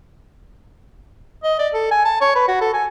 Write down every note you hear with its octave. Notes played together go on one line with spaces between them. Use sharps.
D#5
D5
A4
G#5
A5
C#5
B4
F#4
A4
G#5